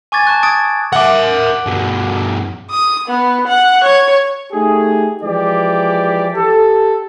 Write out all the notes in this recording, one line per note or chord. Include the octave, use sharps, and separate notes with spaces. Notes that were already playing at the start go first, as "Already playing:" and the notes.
G#5 C#6 D6 G#6 A6
A5 C#6 F#6
D#6 G#6 A6 D7
A#4 E5 F#5 D6
G2 B2
D#6
B3
F#5
C#5
A3 D#4 G4 G#4
E3 F3 G#3 G4 D5
G4 A4